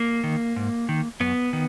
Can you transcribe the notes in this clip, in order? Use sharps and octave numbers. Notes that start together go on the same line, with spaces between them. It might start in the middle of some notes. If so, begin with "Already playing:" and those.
Already playing: A#3
D#3
G#2
D#3
F#2 B3
D#3